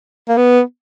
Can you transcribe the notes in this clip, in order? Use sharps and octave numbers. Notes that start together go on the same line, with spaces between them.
A#3
B3